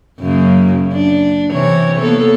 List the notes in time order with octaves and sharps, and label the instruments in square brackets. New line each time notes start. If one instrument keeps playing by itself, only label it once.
[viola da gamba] F#2 C#3 A#3
D4
C3 E3 C#5
A#3 B3 A4